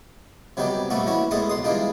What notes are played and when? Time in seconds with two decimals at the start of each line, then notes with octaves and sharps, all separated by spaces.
0.57 C3 F#3 G3 B3 D#4 G4
0.90 A#2 G3 A3 B3 F#4 A4
1.07 E3 B3 C#4 E4 F#4
1.31 A2 G#3 A3 B3 A4 D#6
1.49 B1 C6 D#6
1.64 E3 G3 G#3 D4 D#4 F4